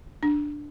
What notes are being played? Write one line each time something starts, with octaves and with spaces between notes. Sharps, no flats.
D4